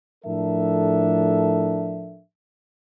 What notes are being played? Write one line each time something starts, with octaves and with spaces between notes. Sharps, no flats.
A2 F3 D4 A4 A#4 E5